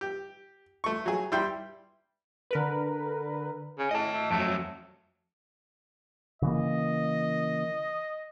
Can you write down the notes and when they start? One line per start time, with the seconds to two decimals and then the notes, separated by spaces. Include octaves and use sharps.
0.01 G4
0.84 A3 C#6
1.06 F#3 G#4
1.32 G3 E4 G5 C6
2.51 D3 A#4 B4
3.78 C#3
3.91 A2 D#5 A5
4.13 A3
4.31 F2 F#3 A3
6.42 C#3 E3 A#3 D#5